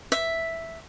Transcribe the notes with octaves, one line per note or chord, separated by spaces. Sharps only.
E5